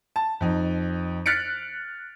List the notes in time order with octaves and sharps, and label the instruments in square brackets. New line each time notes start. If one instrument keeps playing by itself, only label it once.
[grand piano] A5
F2 D#4
F6 F#6 A6 B6 C#7 D7